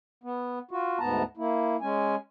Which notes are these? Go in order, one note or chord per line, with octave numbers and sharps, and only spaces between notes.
B3
F4 F#4
D2 G#2 B3 A5 A#5
A#3 E4
G#3 C#4 G#5